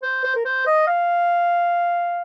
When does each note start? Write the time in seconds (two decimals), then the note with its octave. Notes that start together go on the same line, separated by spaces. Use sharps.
0.03 C5
0.24 C5
0.36 A#4
0.45 C5
0.66 D#5
0.87 F5